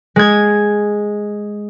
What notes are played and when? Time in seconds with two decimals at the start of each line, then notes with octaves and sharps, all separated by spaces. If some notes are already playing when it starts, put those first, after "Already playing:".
0.16 G#3 G#6